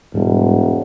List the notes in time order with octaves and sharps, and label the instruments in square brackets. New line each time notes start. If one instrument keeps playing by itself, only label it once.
[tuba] E1 [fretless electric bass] G#2 G3 D4